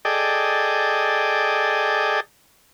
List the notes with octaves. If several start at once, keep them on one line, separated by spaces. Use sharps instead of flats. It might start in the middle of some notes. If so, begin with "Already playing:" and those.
G#4 A4 D5 D#5 G5